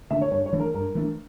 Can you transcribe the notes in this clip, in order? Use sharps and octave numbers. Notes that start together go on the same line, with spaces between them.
D3 A3 D4 E5
C#5
G2 C#5
C#5
E3 A3 D4
A#4
G2 A#4
E3 A3 D4